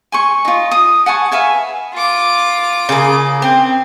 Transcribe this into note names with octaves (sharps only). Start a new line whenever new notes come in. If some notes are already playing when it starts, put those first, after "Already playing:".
G#5 C6 C#6
D#4 F4
D#6
F#5 G#5 A5 C#6
B4 E5 F5 G#5
F4 D6
C#3 A#3 G#4
C4 G5